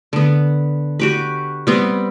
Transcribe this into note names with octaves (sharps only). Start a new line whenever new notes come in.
D3 B3
F#4 G4 B4
G3 B3 C4